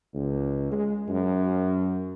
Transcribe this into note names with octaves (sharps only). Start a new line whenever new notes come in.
C#2
G#3
F#2